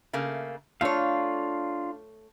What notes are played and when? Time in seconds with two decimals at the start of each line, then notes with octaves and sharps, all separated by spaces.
0.13 C#3 A3 A#3
0.81 A3 D4 F4 C#5 F5